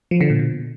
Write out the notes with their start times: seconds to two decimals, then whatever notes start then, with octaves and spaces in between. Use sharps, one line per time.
0.11 F3
0.21 D3
0.30 A#2
0.39 B2